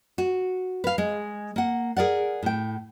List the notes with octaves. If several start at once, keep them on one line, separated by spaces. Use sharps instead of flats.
F#4
B4 F5
G#3
A#3 F#5
G#4 A#4 D5 F#5
A2 G5